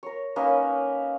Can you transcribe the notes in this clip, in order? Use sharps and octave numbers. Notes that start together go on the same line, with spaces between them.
A#4 C#5
A#3 C#4 D#4 B4